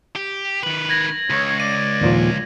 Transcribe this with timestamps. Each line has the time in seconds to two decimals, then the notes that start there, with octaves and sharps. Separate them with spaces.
0.16 G4
0.63 D#3 B4 F#7
0.89 G#6 A#6 F#7
1.30 C#2 C#5
1.60 D5 D#7
2.01 D#2 A#2 F3